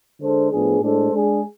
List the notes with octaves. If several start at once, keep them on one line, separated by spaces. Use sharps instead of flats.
D3 G#3 D4 A4 C5
A2 F3 B3 D4 G#4
A2 G#3 D4 A4 C5
G#3 D4 G#4